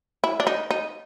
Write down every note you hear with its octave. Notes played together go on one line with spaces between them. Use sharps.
E4
D4
D#4
D#4